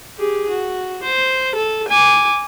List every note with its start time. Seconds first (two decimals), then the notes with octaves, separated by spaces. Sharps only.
0.18 G4 G#4
0.50 F#4
1.03 C5
1.55 A4
1.88 G#5 D6